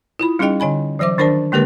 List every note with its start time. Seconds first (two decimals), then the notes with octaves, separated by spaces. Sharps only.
0.19 E4 F4 B5
0.39 G3 C#4 D#4 G#4 D#5 G5
0.60 D3 D#5 G#5 B5
0.99 E3 F#3 C5 E5 D6
1.18 D#3 D4 A#4 C5 D5 A5
1.52 D3 G#3 A#3 G4 A#4 B4